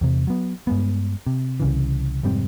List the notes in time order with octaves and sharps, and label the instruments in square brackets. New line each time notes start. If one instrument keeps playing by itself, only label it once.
[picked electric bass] E2 C3
F#3 B3
G2 G#3 B3
C3
C2 C#3 E3
F1 G#2 G3 C4